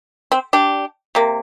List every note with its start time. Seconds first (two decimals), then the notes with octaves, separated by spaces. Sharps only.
0.32 C4
0.53 D4 G4
1.15 C3 A#3